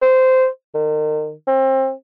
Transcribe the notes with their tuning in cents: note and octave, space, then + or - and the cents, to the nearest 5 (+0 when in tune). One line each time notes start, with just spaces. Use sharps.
C5 -15
D#3 -35
C4 +30